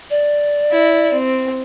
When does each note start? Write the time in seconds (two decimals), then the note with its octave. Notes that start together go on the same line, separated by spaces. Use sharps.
0.10 D5
0.71 E4
1.13 C4